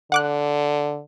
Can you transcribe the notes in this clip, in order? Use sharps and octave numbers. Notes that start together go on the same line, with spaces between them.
D3 F#5 D6 F#6